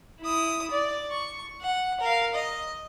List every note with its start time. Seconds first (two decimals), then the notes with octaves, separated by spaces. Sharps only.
0.21 E4 D#6
0.71 D5
1.11 C#6
1.61 F#5
2.00 A#4 F5
2.34 D#5